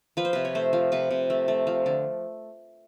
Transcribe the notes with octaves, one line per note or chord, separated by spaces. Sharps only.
F3 B4
C5
C3 B4
C#5
A3 C5
F3
C3 B4
C3
A3
A3
F3
D3